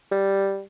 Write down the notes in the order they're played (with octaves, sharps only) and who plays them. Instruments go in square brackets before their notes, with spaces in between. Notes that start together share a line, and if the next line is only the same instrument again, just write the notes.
[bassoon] G3